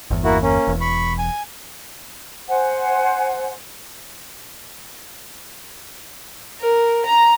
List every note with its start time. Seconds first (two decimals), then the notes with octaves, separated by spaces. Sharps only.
0.11 G1 E2
0.24 A#3 E4 F#4
0.42 A#3 C#4
0.67 E1 E2
0.81 B5 C#6
1.18 G#5
2.48 C5 F#5 G#5
6.60 A#4
7.06 A#5